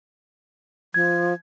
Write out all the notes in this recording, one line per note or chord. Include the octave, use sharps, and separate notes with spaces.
F3 G#6